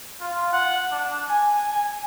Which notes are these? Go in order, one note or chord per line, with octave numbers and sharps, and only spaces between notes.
F4
F#5
D4
G#5
G#5